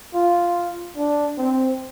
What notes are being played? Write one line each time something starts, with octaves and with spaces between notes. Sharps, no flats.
F4
D4
C4